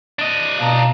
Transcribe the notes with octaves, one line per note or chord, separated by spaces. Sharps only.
D4 D#5
B2 F5 A5 A#5